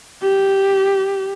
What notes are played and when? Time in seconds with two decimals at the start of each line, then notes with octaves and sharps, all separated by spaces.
0.23 G4